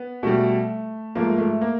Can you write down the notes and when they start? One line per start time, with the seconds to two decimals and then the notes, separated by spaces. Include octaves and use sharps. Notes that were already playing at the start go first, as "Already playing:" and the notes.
Already playing: B3
0.23 B2 G3 A3
1.15 G#2 F3 A3 A#3
1.38 A3
1.61 A#3